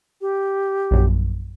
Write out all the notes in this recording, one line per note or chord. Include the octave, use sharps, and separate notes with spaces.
G4
A#1 F#2